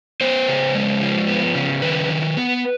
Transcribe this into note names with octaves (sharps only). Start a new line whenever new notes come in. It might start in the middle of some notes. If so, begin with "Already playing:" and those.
B3 C5
C#3
G#3
F3
B3
C#3
D#3 B4
D#3
B3